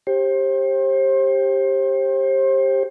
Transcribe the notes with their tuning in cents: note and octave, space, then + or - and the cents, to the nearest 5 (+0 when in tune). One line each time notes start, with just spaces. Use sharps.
G4 +5 C5 +35